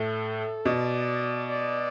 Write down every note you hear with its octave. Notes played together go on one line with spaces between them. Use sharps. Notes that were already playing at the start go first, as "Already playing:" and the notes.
Already playing: A2 A4
B2 D5
D5